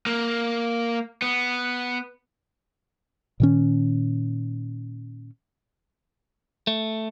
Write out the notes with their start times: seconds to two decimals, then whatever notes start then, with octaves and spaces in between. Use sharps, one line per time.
0.07 A#3
1.22 B3
3.40 A#2 D#3 C#4
6.67 A3